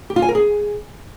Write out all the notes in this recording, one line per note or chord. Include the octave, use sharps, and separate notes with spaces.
G4
F4
G#5
A#4
G#4